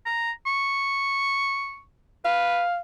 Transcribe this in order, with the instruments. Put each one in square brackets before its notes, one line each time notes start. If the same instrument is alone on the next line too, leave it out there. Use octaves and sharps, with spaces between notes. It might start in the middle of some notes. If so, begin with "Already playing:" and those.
[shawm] A#5
C#6
[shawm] B4 [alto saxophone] F5